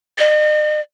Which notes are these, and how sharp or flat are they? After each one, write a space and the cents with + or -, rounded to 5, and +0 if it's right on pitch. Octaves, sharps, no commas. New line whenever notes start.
D#5 -45